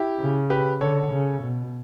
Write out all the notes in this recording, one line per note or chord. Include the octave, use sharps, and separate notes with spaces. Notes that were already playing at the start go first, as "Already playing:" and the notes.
Already playing: E4 G4
C#3
G4 B4
D3 A4 C#5
C#3
B2